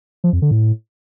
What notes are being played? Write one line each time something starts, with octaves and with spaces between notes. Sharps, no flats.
F3
F2
D3
A2